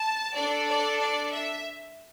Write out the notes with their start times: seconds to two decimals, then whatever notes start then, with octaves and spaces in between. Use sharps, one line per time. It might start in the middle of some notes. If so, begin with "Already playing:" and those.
Already playing: A5
0.35 D4 A4 D5
0.68 D5
1.01 D5
1.33 E5